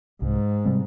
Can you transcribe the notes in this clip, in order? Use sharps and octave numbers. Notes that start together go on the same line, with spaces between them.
C2 G#2
C3 G3 C4